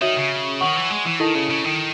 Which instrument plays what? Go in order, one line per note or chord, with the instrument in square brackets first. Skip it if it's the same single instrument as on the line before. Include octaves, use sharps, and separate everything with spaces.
[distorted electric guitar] D#3 [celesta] F#4 C#5 E5
[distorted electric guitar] C#3
[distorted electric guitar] D#3 [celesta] C#5 F#5 C#6
[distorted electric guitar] E3
G#3
E3
[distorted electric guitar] D#3 [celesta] E4 A4 D#5 A5
[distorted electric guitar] C#3
C#3
D#3